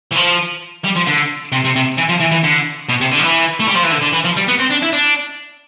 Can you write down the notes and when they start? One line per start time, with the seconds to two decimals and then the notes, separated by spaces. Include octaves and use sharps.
0.12 E3
0.17 F3
0.85 G3
0.96 F3
1.07 D3
1.52 C3
1.65 C3
1.76 C3
1.98 E3
2.09 F3
2.21 E3
2.32 E3
2.44 D3
2.89 B2
3.01 C3
3.12 D3
3.19 F3
3.23 E3
3.60 A3
3.68 G3
3.75 F3
3.84 E3
3.92 D3
4.02 D3
4.13 E3
4.25 F3
4.37 G3
4.48 B3
4.59 C4
4.70 D4
4.82 E4
4.93 D4